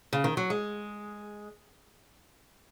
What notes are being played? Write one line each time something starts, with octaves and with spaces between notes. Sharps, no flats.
C#3
D#3
F#3
G#3